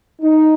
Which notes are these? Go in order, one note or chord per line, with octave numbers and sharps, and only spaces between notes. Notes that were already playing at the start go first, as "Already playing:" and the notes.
D#4